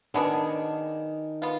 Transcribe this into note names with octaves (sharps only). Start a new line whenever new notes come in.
D#3 F#3 B3 D4 G#4
B3 F4